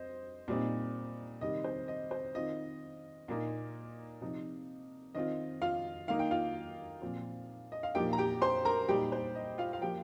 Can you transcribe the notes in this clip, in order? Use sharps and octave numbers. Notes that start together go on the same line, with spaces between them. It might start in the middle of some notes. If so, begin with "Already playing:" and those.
Already playing: C4 C5 D#5
A#2 G3 C4 D#4
C3 D#3 G3 D#5
C5
D#5
C5
D#3 C4 F4 D#5
A#2 A#3 D#4
C3 F3 D#4
D#3 C4 F4 D#5
F4 F5
D#3 A#3 D#4 F5
G5
F4 F5
A#2 F3 C4 F4
D#5
F5
A#2 F3 A#3 D#4 G4 G5
A#5
G4 G5
C5 C6
A#4 A#5
A#2 G3 D#4 G4 G5
C5
D#5
F4 F5
F5
F3 A#3 F4 G4 G5